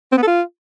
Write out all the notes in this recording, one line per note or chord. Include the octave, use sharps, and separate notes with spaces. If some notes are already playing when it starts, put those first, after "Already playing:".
C4
B3
A4
F4